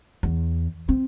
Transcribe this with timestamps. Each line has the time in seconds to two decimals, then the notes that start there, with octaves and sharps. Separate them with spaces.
0.23 E2
0.88 C4